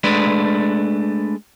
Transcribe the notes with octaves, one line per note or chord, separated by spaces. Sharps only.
G#3 A3 D4 B4